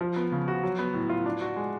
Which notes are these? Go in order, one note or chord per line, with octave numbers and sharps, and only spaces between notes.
F3
B3
C#3
F#4
F#3
B3
A2
F4
D4
F#4
G#3